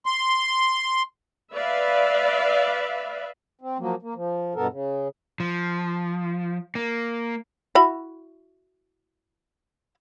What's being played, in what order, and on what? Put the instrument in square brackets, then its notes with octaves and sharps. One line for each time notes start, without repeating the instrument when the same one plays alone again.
[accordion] C6
[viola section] B4 D5 E5 F5
[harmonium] C4
F3 F#3 A#3
A#3
F3
G2 B2 B3 A4 A#4
C#3
[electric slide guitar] F3
A#3
[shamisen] E4 F#4 B5